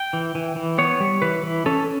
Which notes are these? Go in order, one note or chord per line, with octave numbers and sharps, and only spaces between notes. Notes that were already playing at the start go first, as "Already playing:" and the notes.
Already playing: G5
E3
E3
E3
B3 C#5
G3
E3 B4
E3
C#4 A4